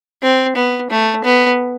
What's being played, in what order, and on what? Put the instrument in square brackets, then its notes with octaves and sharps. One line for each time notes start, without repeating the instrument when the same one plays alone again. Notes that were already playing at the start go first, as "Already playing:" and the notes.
[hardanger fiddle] C4
B3
A3
B3